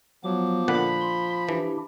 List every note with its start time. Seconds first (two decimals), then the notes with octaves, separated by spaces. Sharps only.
0.24 F3 F#3 B3 D6
0.68 A#2 D3 F#5 B5
1.01 C6
1.49 E3 D4 E4 G4